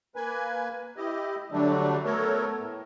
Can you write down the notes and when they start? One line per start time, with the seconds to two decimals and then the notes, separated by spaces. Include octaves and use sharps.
0.16 A#3 B4 G#5
0.97 E4 G4 D#5
1.52 D3 F#3 G3 A3 D4
2.05 A3 B3 A4 A#4 C#5
2.59 A2